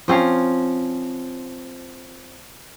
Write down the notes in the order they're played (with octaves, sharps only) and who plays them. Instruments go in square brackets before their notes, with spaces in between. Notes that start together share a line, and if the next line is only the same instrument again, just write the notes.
[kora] F3 C4 C#4 F5